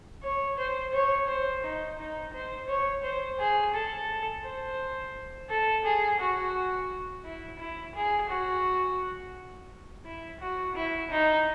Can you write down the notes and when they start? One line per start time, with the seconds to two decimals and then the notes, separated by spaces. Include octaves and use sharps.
0.22 C#5
0.57 C5
0.93 C#5
1.28 C5
1.63 D#4
1.98 D#4
2.33 C5
2.67 C#5
3.03 C5
3.39 G#4
3.74 A4
4.44 C5
5.49 A4
5.84 G#4
6.20 F#4
7.24 E4
7.59 E4
7.95 G#4
8.29 F#4
10.05 E4
10.40 F#4
10.75 E4
11.11 D#4